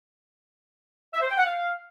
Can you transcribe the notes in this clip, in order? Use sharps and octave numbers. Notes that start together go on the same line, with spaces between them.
E5
C5
G5
F#5
F5